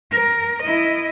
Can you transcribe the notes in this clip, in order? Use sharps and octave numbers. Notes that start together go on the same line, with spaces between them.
A#4
E4 D#5